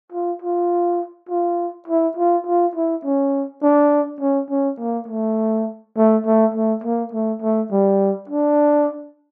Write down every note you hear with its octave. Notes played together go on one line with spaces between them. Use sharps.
F4
F4
F4
E4
F4
F4
E4
C#4
D4
C#4
C#4
A#3
A3
A3
A3
A3
A#3
A3
A3
G3
D4